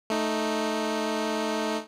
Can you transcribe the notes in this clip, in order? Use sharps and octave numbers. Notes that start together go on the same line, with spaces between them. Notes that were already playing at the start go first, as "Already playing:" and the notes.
A3 D#4